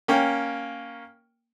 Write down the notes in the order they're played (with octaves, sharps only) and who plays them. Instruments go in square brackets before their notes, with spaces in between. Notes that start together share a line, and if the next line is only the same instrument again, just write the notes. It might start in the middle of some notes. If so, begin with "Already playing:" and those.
[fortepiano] A#3 C#4 G5